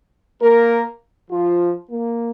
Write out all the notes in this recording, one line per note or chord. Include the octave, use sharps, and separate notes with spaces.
A#3 A#4
F3 F4
A#3